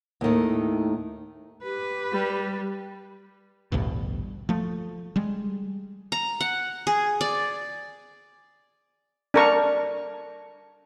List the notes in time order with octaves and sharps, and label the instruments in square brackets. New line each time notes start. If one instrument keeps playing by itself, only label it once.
[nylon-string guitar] D#2 A2 D#3 A3
[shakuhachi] G4 [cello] B4
[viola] G3
[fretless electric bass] A1 D2 G2 B2
F3 A3
G3 G#3
[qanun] A#5
F#5
G#4
D5
[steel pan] D4 A#4 C#6